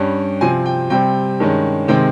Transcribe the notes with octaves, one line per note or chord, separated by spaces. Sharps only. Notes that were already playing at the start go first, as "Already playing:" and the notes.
Already playing: G2 G3 C#4
C3 F3 C4 G#5
G5
C3 G3 C4 G5
G2 D#3 G#3 C#4
C3 D#3 G#3 C4 G5